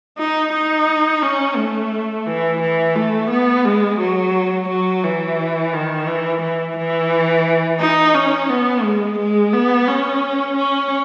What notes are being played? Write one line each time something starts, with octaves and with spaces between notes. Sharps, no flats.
D#4
D#4
C#4
A3
E3
E3
A3
B3
G#3
F#3
F#3
E3
D#3
E3
E3
E3
D#4
C#4
B3
G#3
G#3
B3
C#4
C#4